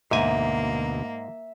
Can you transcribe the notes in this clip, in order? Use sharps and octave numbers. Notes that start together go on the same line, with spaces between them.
D2 G#2 B2 A#3 E5 G#5